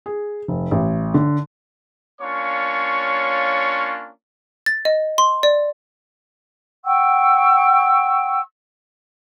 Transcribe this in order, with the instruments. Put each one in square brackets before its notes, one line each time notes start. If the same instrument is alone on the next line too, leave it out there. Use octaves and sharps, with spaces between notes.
[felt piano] G#4
F1
A1
D3
[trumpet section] A#3 C#4 D4 F4 C#5 C#6
[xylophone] A6
D#5
C6
D5
[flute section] F#5 G5 C#6 E6